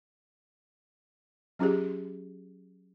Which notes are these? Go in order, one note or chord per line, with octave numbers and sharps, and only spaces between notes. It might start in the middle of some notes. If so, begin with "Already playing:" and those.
F#3 C#4 F4 G4 G#4